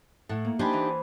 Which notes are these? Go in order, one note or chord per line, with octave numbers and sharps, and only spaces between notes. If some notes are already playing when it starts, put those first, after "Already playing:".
A2 A4 F#5
A#3
D4 D#4 G4 C5 G#5 B5
E3